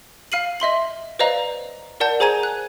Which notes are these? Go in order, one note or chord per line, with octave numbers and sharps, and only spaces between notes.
F5 F6 C7 D#7 F#7
D#5 E5 C6 F#7
B4 C5 D5 D#5 F5 A#5
A#4 D5 F#5 A5 G6
G#4 C5 G#5 A#5 G#6 D#7
F#6